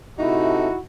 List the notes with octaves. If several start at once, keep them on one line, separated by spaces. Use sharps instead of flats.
C3 A3 D#4 E4 F#4